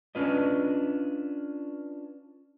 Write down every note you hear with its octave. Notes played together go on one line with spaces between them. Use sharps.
C#4 D4 F4 B4 D#5